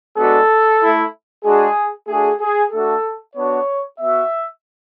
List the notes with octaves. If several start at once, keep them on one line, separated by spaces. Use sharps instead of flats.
G#3 B3 D4 F#4 A4
A3 E4
G#3 D4 F#4 G#4
A3 D4 F#4 G#4
G#4
A3 D4 F#4 A4
B3 D4 F#4 C#5
B3 F#4 E5